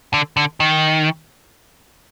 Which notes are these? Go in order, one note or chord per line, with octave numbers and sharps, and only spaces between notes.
D3
D3
D#3